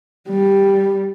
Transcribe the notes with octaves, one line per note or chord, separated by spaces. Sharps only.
G3